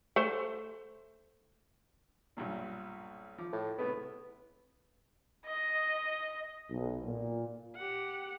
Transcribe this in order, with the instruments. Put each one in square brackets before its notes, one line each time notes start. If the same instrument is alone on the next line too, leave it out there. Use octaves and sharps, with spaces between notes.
[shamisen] A3 C5
[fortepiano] B1 G2 A#2
F3 D6
[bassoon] A2
[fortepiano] C3 A3 E4 [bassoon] B3
[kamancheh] D#5
[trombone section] B1
A#2
[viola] G4 F#5